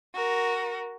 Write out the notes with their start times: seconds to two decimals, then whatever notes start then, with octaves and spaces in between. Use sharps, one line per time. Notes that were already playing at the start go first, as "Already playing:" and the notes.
0.15 F#4 A#4